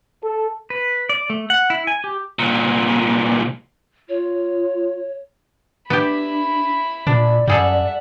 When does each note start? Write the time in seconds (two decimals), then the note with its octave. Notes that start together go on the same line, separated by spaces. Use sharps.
0.24 A4
0.70 B4
1.09 D5
1.30 A3
1.50 F#5
1.70 E4
1.87 G#5
2.04 G4
2.39 C2 A#2
4.09 F4 C#5
5.90 B3 D4 E4 G4 B5
7.07 A#2 D4 D5
7.48 F#2 G3 G#4 A4 E5 F#5